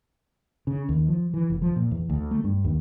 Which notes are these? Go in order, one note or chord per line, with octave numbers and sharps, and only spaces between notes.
C#3
D#2
F3
E3
F1
F3
A#2
E2
D2
A3
G2
D#2